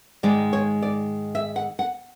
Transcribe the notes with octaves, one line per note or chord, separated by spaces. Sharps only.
G#2 D#3 G#3 D5
C#5
D5
E5
F#5
F#5